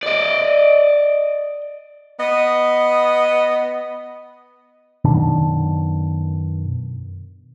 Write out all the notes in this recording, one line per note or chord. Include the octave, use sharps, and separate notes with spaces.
D5 D#5
B3 D#5
F#2 B2 D#3 D4